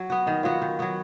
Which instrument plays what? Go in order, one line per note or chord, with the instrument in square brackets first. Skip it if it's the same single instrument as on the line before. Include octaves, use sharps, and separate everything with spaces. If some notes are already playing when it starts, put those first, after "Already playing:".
Already playing: [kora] F#3
B3 F#4
[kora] D#3 [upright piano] D#4
[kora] F#3 B3 F#4 [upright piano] F4
[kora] D#3
F#3 B3 F#4